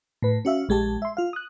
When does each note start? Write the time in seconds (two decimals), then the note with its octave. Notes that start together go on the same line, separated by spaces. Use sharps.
0.22 A2 B4
0.45 C#4 F#4 E5 F5
0.69 A#1 G#3 G4 A5
1.02 E5 C6
1.17 F4 F5
1.33 D#6 F#6